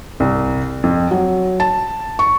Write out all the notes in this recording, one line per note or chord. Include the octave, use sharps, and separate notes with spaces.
C2
F2
F#3
A5
C#6